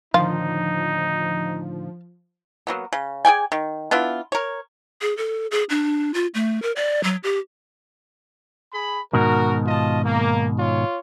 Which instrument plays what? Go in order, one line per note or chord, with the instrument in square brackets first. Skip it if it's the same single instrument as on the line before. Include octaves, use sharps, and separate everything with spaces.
[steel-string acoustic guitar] A2 D3 D#3 [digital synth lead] F3 [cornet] D#4 [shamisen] F4
[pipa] F#3 A#3 B3
C#3
G#4 D5 G5 G#5
D#3
B3 D4 E4 F4
A#4 C#5
[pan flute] G#4
A4
G#4
D4
F4
A3
A#4
D5
F#3
G4
[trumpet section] G#4 B5
[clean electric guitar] G#2 B2 D#3 [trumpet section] F#4 A#4
[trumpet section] F4 D#5 A5
A#3
F4 C#5